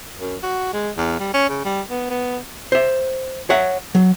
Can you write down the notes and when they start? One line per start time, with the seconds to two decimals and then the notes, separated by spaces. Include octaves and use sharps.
0.19 F#2
0.43 F#4
0.73 G#3
0.97 E2
1.20 G3
1.34 C#4
1.49 C#3
1.65 G3
1.90 B3
2.10 B3
2.72 C5 E5
3.50 C#5 E5 F#5
3.95 F#3